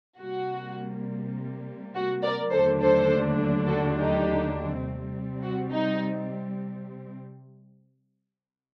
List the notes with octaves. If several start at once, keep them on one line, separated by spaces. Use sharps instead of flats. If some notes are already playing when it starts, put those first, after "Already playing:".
C3 G3 A#3 F#4
F#4
A#4 D5
D#2 D3 F#3 A3 D4 A4 C5
A4 C5
F#4 A4
D#4 G4
C3 G3 C4
F#4
D#4